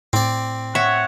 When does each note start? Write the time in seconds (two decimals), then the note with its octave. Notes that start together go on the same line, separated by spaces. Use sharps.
0.13 A2 C4 D5
0.75 C#5 E5 F#5